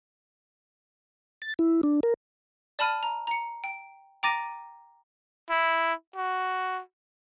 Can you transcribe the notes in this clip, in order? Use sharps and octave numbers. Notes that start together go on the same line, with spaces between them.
A6
E4
D4
A#4
D5 A5 B5 F6 D#7
A#5
A#5 C#7
G5
G5 A#5 D6 A6 A#6 D#7
E4
F#4